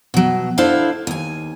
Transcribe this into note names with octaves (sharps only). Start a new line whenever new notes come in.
B2 F#3
D4 E4 A4 C5 F5
D#2 G#5